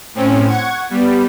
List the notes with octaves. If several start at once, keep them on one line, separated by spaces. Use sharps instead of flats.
A2 C4 C#4
F#5 C#6 G#6
G3 B3